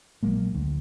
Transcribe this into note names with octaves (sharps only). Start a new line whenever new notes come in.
A#1 F#3 G#3 A#3
D2